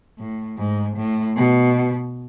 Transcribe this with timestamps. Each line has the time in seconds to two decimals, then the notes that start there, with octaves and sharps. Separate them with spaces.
0.18 A2
0.58 G#2
0.96 A2
1.36 B2